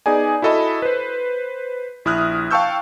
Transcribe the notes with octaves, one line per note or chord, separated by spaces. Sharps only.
B3 D#4 G#4 D5 G#5
E4 F#4 A4 D#5 B5
B4 C5
A#1 E4 D#6 F6 F#6
F5 G5 A5 C#6 E6 G6